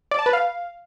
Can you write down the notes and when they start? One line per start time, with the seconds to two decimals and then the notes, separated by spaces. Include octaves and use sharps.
0.11 D5
0.19 A5
0.26 B4
0.33 F5